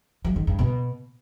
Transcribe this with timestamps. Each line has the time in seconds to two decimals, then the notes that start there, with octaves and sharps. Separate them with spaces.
0.25 F#3
0.36 D#3
0.47 G2
0.59 B2